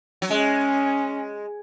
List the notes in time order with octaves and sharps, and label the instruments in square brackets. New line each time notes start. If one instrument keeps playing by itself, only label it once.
[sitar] F#3
[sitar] G#3 [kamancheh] C#4